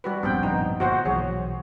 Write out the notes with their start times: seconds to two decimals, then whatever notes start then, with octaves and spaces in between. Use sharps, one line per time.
0.04 G3 F#4 B4
0.23 D1 A#1 G2 B3 C4 G5
0.43 D#4
0.80 G1 A#2 F#4 C5 F#5
1.05 B1 E3 F#3 G#4 C#5